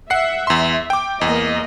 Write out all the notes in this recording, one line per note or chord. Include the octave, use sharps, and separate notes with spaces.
E5 F#5 C7
E2 C6
G5 D6
E2 A#3 D#5